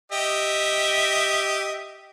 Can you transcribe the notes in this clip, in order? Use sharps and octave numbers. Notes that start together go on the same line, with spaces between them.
G4 D#5 E5